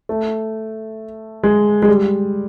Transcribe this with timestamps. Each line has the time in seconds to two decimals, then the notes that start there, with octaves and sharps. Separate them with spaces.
0.09 A3
1.44 G#3
1.82 G#3
1.88 G3